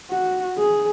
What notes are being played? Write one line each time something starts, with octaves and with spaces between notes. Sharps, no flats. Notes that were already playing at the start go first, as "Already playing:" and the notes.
F#4
G#4